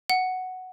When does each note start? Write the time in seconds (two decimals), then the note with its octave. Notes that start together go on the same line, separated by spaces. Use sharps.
0.10 F#5